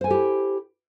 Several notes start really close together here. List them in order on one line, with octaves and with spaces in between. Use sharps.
C5 G#5 A4 G4 E4